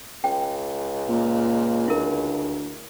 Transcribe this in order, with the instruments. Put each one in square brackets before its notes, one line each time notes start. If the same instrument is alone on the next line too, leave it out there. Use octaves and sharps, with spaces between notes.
[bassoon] C#2 [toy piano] G5
[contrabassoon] A#2
[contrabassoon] D2 [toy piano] E4 A#4